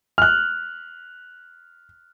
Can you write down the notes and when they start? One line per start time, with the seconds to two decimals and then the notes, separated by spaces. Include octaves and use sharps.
0.18 F6
0.22 F#6